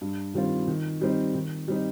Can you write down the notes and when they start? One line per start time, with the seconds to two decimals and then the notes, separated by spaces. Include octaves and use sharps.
0.01 G2
0.34 D#3 G3 C4 F4
0.68 D#3
1.01 G3 C4 D#4
1.35 D#3
1.68 G3 C4 D#4